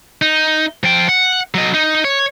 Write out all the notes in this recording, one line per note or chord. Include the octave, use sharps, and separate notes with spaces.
D#4
F3 G5
F#5
F#3 D#5
D#4
C#5